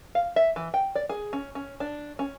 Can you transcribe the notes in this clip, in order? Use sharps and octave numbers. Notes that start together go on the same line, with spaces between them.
F5
E5
E3
G5
D5
G#4
C#4
C#4
D4
C#4